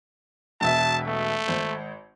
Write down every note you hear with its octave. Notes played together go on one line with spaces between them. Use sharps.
E1 B2 E5 A5
A3
G#1 C5